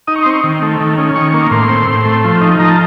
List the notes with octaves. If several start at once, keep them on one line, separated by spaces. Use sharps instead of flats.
D#4 D#6
C#6
C6
C4 C#6
D#3
A3
D#3
C#4
D#3 C#6
A#3
A2 C6
C4
A2
A3
F3
D#4
F3 A#5
A5